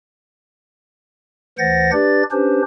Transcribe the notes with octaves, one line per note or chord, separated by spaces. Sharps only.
D2 E3 C5 F#5 A6 A#6
D4 G4 B4 D5 A6
C#4 D4 G4 B4 C5